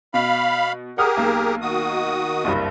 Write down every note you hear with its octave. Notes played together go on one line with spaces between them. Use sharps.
B2 F5 B5
G4 G#4 A#4 F#5 D#6 F6
B1 A#3
D#3 F#4 D#6
F#1 C2 G2